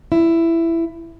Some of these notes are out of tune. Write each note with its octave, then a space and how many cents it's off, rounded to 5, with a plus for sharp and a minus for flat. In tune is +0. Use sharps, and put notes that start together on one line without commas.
E4 +10